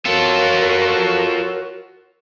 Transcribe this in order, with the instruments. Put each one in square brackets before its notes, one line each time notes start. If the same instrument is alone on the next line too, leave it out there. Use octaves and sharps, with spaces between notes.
[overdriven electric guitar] F4 A4 [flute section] F#4 A#4 C#5